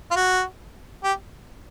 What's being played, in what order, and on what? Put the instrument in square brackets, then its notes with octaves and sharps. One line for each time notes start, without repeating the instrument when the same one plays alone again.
[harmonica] F4
F#4
G4